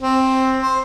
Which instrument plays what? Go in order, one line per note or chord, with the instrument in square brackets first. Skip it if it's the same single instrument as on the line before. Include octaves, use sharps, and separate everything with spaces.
[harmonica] C4
C5